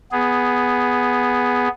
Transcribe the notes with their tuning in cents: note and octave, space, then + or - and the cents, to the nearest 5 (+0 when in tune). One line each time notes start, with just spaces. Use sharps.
B3 +0 G#4 +0